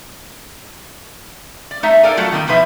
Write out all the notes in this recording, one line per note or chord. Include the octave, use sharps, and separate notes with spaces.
D5
A3 D#4 E5
A4 A#4 D5 F5 G#5
F#3 A3 F4 F#4 A4
D#3 G3 A#3 D#4
B2 E3 F3 D#4 B4 E5